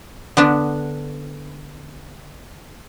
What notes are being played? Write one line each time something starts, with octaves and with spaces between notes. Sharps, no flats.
D3 B3 D4